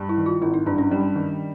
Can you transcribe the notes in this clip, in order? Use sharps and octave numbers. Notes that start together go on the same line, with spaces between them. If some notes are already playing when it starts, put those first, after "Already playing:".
Already playing: G2 G3
E4
D#3
F4
G#1 E4
D#4
G2 D4
C#4
G3
D#3